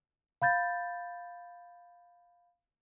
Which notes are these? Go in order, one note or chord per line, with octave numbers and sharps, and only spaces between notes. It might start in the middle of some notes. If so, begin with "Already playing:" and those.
F5 B5 G6 A6